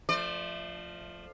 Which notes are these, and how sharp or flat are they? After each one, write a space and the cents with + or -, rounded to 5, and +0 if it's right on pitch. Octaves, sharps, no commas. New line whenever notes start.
F3 +0 A3 +0 D5 +35